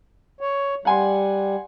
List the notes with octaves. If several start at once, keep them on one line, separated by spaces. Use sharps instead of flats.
C#5
G3 F#5 G#5 C6